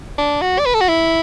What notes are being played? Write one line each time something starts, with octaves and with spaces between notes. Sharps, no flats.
D4
F#4
D5
B4
A4
F#4
E4